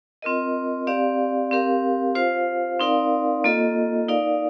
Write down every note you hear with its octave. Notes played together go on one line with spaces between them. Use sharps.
C4 F4 A#4 D#5
C4 G4 D5 F5
C4 G4 A#4 F5
F4 C5 F5
C4 D#4 A#4 D5 F5
A#3 F4 A4 D#5
D#4 A#4 D5 F5